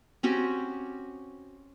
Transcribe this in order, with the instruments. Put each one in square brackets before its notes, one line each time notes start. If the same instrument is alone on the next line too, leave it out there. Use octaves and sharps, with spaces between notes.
[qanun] C4 C#4 F#4 G4